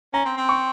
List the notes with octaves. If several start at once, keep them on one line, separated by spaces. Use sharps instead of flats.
C#4 A#5
C4
C4
C#6